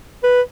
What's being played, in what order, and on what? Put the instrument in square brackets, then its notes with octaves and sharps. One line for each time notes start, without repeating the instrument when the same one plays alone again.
[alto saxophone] B4